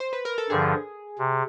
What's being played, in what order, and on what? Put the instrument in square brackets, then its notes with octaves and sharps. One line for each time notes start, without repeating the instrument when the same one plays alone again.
[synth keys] C5
B4
A#4
A4
[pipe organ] G2 D3 F3 [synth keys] G#4
[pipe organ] C3